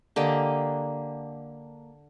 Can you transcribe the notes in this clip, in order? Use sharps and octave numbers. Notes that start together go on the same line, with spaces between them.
D3 A#3 G4 D#5